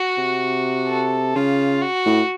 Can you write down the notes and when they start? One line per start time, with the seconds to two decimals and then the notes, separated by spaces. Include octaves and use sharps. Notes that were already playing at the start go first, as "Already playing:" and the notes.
Already playing: F#4
0.18 C3
0.89 A4
1.35 C#3 F4
1.82 F#4
2.06 A2